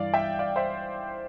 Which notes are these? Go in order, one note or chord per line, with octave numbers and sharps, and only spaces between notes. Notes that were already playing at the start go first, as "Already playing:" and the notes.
Already playing: G2 E3 D5 F5
E5 G5
D5 F5
C5 E5